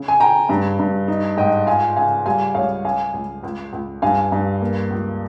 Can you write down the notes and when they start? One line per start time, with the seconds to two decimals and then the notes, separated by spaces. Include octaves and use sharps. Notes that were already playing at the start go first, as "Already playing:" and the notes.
Already playing: C#3
0.08 G#5
0.20 C#3 G5 A#5
0.49 G2
0.79 G2
1.08 D#4
1.37 G#2 D#5 G5
1.66 F4 F5 G#5
1.96 C#3 F5 G#5
2.26 G3 F5 G#5
2.55 C#2 C#5 F5
2.84 C#4 F5 G#5
3.13 C#2
3.43 C#2
3.73 C#2
4.02 G2 F5 G#5
4.32 G2
4.62 A#3
4.90 C#2